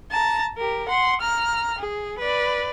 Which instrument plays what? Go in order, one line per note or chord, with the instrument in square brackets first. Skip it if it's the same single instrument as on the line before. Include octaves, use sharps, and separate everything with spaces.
[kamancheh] A5 A#5
G4 A#4
F#5 C6
A#5 F6
G#4
B4 D5